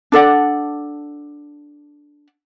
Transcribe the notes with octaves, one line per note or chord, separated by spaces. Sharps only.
D4 A4 D5 F#5